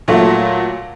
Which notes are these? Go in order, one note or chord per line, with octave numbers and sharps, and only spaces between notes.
A#2 F#3 A3